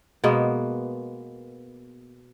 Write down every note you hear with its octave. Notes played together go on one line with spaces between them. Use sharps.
B2 G#3 A#3 B3